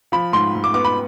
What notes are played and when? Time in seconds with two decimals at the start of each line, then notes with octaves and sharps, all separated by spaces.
0.12 F3 B5
0.33 G#2 C6
0.55 G#2
0.64 D6
0.74 B3 D6
0.85 B5